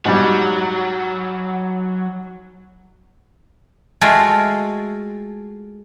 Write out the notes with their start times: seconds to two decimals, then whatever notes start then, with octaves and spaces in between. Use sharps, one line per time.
0.05 G#2 F#3 G3
4.01 G#3 A3 F4 F#4 F5 G5